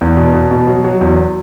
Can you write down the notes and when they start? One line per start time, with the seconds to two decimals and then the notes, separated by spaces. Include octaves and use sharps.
0.01 E2
0.17 B2
0.34 B2
0.51 B2
0.67 F#3
0.84 F#3
1.01 E2